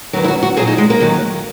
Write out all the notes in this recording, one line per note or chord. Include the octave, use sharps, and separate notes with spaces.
E2 D#3 F#3 F#4
E4
F#4
F#4
A#2 F#3 G#4
D#4
G#3
A#3
F#2 D#3 F#3